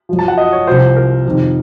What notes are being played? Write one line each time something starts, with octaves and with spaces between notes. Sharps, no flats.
F#2 F3
A5
F#5
D#5
C#5
C2 C3 F3 C5
A#4
F2 C3 D#3